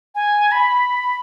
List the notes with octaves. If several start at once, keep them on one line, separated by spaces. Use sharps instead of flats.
G#5
B5
B5